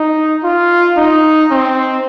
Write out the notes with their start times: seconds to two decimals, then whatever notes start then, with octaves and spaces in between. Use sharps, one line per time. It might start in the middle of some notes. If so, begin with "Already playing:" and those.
Already playing: D#4
0.43 F4
0.97 D#4
1.50 C4